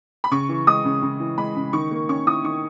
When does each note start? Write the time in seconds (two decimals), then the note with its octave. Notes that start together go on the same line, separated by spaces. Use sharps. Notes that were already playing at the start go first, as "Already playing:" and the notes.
0.24 B5
0.31 C#3 C#6
0.49 E3
0.67 G#3 D#6
0.85 C#3
1.02 C#3
1.20 E3
1.38 G#3 B5
1.56 C#3
1.73 D#3 C#6
1.91 A#3
2.09 C#4 C#6
2.27 E4 D#6
2.44 D#3 C#6